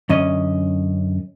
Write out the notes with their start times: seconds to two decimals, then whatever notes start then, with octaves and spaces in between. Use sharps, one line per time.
0.09 F#2 D3 C#4 D#5